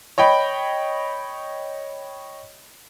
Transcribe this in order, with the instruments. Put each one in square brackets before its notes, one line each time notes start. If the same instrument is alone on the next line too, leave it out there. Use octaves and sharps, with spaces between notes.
[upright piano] C#5 D#5 G5 B5